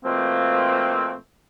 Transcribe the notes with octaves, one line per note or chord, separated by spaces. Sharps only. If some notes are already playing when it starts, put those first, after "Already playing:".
B2 F3 A3 A#3 C4